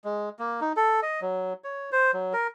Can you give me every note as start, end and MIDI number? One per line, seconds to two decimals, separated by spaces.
0.04 0.29 56
0.39 0.60 58
0.61 0.73 63
0.76 1.00 69
1.03 1.20 75
1.21 1.53 54
1.64 1.90 73
1.92 2.11 72
2.13 2.33 54
2.33 2.47 70